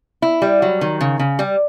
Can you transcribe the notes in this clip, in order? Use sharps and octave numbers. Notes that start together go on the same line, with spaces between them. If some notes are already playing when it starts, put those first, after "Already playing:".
E4
G3
F#3
D#3
C#3
C#3
G3